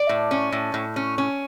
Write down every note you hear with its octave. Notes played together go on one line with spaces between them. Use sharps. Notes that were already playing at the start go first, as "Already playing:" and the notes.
Already playing: D5
A2
C#4
A2
A2
C#4
C#4